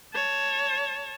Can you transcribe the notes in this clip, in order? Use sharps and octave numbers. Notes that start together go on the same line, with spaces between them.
C#5 A5